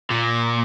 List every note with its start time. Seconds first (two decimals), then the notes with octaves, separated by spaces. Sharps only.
0.11 A#2